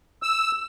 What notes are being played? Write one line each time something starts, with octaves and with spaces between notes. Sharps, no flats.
E6